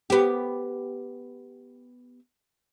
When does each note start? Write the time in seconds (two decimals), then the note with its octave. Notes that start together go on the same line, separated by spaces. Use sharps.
0.10 B3 G4